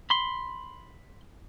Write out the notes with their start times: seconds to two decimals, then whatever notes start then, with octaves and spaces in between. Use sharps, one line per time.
0.10 B5 C6